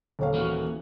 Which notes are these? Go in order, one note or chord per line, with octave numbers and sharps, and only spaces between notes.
D#1 C#5 F5
E3 A#3 F#4